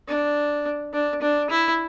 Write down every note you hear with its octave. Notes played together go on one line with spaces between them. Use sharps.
D4
D4
D4
E4